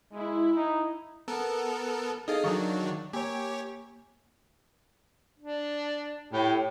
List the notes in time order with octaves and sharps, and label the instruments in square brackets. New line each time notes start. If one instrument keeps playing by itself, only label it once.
[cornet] G#3 [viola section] E4
[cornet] D#4
[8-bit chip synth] B3 A4 A#4
[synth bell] D#4 G#4 A4 [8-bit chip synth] D#5 F5
[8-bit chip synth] D#3 F#3 D4 [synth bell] F5 C#6
[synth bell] A#3 G#5 [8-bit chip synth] G4 C#5
[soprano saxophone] D4
[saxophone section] A2 [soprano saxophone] G4